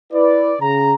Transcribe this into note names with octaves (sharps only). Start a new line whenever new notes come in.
E4 B4 D5
C#3 A#5